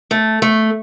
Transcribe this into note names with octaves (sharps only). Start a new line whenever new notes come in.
A3
A3